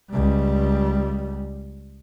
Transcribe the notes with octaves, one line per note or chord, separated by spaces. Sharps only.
C#2 G3